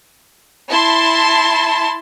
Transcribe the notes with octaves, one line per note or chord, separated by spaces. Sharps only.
E4 A5 C6